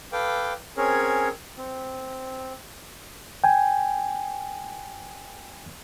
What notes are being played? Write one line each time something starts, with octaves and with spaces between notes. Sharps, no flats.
A4 B4 F5 G5 D6
C4 C#4 G#4 A#4 C#5
C4
G5 G#5